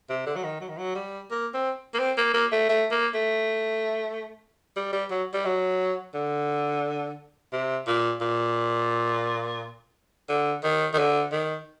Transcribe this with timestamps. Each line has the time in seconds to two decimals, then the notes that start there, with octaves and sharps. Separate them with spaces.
0.10 C3
0.26 D3
0.36 F#3
0.44 D#3
0.61 F#3
0.69 D#3
0.78 F#3
0.95 G3
1.31 A#3
1.54 C4
1.95 A#3
2.00 C4
2.17 A#3
2.34 A#3
2.52 A3
2.69 A3
2.91 A#3
3.14 A3
4.76 G3
4.93 G3
5.11 F#3
5.34 G3
5.45 F#3
6.14 D3
7.53 C3
7.87 A#2
8.21 A#2
10.29 D3
10.64 D#3
10.94 D#3
10.99 D3
11.32 D#3